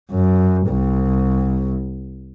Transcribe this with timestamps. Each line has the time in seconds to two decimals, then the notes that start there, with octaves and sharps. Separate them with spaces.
0.11 F#2
0.68 C2